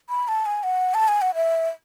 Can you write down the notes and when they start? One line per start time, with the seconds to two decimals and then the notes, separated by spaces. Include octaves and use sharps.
0.09 B5
0.28 A5
0.46 G#5
0.63 F#5
0.94 A5
1.08 G#5
1.22 F#5
1.35 E5